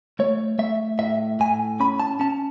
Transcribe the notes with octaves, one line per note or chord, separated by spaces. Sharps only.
A3 C#5
A3 E5
A2 E5
A2 G#5
C#4 B5
A5
C#4 A5